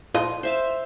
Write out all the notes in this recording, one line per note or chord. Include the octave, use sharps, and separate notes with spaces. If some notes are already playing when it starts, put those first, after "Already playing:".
F4 D#5
C5 E5 F5